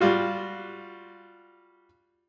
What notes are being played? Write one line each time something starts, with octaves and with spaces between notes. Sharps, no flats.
G3 F4 F#4